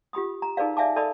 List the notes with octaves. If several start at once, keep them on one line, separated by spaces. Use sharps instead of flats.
F4 G4 B5 D#6
A#5
D#4 G#4 A#4 B4 D5 F5
D5 E5 F5 G#5 A5 D6
A4 A#4 D5 D#5 A5 B5